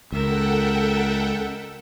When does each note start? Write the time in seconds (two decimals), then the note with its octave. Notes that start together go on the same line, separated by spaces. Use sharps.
0.12 C#2 A4 A#4 E5 F#5 G5